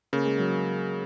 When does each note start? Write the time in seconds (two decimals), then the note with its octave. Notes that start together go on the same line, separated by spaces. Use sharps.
0.13 C#3 A#3
0.25 G#3
0.38 F#3